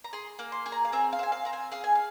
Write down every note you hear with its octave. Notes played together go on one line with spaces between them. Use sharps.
A#5
G#4 C6
A#3
C6
G#4
A#5
F5
C4 G#5
F5
C4 G#5
F5
C4 A#5
G#5
G#4 F5
G#5
F5